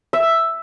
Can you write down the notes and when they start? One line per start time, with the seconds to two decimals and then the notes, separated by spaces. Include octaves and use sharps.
0.13 E5